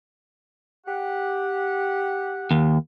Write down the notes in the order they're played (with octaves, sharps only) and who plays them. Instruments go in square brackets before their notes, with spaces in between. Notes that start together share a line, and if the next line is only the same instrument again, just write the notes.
[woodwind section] G4 F#5
[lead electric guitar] D#2